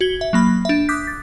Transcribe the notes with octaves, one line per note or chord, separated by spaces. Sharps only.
F#4 G#6 G7
E5
F#3 A#3 B5
D4 E5
D6 D#6 F#6 G6 B6
A6